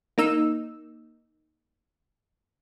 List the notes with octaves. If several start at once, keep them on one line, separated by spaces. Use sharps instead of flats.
A#3 D#4 E6